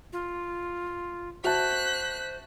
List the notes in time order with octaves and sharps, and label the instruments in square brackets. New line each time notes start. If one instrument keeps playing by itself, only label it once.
[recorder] F4
[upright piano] F#4 E5 A5 [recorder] C5 [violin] F#6 B6